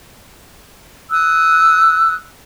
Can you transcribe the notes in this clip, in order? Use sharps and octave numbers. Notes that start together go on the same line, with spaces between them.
D#6 E6 F#6